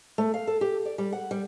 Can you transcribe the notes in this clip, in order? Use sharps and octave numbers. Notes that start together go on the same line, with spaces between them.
A3
F5
A4
G4
D5
G3
F#5
G3